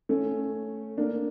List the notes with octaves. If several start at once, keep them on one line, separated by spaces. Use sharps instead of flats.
A3 C#4
A#3 D4